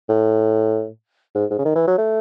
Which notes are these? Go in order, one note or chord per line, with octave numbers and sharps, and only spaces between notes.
A2
G#2
G#2
C#3
D#3
E3
F#3
A3